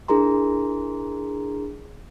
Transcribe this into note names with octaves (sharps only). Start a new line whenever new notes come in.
D4 E4 G#4 A#4 A#5 C6